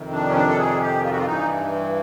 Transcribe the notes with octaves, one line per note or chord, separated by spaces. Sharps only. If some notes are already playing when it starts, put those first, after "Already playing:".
Already playing: F2 C3 D#3
D4
C#4
D4
A4
G#4
G4
F4
F#4
F4
G2 E3 D#4